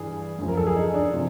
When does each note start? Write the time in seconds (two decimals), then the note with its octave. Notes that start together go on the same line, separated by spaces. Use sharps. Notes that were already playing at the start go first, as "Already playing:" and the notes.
Already playing: G2 E3 G#4
0.38 F#2 C#3 F3
0.48 A#4
0.57 A4
0.67 G#4
0.76 D#4
0.94 D4
1.14 C3 F3